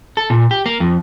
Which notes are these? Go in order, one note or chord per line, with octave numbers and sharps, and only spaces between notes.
A4
A#2
G4
A#3
F2